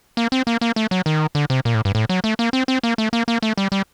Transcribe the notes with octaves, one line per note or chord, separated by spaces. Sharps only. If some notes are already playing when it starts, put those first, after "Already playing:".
A#3
C4
A#3
A#3
A3
F#3
D#3
D3
C3
A#2
A2
G2
A2
F#3
A3
A#3
C4
C4
A#3
A3
A#3
A#3
A3
G3
G3